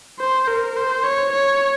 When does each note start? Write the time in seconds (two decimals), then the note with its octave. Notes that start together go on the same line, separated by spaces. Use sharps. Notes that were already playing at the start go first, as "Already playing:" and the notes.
0.20 C5
0.48 A#4
0.76 C5
1.04 C#5
1.33 C#5